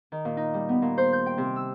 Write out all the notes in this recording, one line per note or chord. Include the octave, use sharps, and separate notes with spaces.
D#3
A#2
D#4
G3
B3
A#2
C5
G6
G5
C3
E6